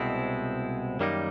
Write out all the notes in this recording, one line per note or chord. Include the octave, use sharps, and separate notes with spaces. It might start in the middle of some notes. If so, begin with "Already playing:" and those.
Already playing: C2 B2 G#3 C4 E4
F#2 D#3 G3 A#3 D#4